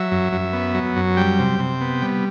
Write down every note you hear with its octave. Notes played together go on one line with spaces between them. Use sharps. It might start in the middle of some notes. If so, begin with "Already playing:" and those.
Already playing: F#3 E5
F#2
F#2
B3
F#3
F#2
G3 G5
C3
C3
B3
G3